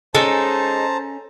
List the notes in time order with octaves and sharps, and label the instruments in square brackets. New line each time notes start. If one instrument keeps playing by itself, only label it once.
[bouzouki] G#3 D#4 [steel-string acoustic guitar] C#4 [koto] A4 [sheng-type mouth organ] C5 A5 A#5